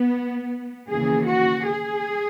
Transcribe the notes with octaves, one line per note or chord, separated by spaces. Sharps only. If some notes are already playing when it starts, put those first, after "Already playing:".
Already playing: B3
D#2 C#3 E3 G#4
F#4
G#4